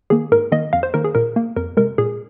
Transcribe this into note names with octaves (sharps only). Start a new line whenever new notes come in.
D#3 A#3 G#4
G#2 A#4
D#3 A#3 D#5
F2 F5
C5
D#3 A#3 A#4
G#4
A#2 A#4
A#3
F2 A#4
C3 G#3 A#4
A#2 G#4